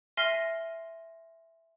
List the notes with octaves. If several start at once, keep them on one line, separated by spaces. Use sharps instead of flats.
E5 G#5 C6 F6 A#6 C7